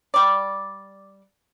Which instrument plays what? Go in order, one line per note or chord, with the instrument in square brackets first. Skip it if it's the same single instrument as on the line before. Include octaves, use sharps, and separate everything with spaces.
[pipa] G3 D5